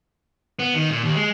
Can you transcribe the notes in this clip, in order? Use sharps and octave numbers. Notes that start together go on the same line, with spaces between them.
B3
D#3
A#2
D#2
G#3